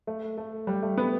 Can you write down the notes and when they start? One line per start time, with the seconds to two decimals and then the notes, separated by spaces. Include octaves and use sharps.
0.07 A3
0.38 A3
0.67 G3
0.82 A3
0.97 B3